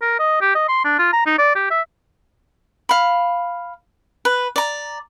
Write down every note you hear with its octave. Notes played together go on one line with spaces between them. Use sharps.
A#4
D#5
G4
D#5
C6
D4
F4
A#5
D#4
D5
G4
E5
F5 B5
B4
D5 A#5